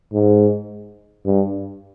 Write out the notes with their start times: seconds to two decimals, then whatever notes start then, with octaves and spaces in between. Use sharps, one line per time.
0.13 G#2
1.25 G2